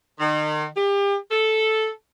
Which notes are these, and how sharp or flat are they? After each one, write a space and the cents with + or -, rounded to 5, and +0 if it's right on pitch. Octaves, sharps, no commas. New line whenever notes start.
D#3 -35
G4 +35
A4 -5